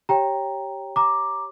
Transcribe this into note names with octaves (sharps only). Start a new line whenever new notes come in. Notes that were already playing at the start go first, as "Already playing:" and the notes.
G4 C#5 G5 A#5
A#5 D6